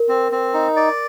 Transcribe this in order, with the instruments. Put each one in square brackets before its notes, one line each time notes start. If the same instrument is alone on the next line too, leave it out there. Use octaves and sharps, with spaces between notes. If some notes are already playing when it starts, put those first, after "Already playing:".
Already playing: [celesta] A#4
[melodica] C4
C4
D#4
D5